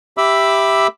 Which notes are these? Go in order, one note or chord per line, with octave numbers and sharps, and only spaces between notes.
G4 E5 B5 D6 E6